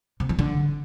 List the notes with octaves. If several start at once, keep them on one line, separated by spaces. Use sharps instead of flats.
C3
E3
D3